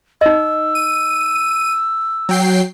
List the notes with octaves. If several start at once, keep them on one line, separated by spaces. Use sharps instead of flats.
D#4 D#5 E6
D#7
F#3 G5 C7